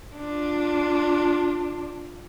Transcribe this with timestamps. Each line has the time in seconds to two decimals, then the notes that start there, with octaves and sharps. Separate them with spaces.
0.17 D4 F4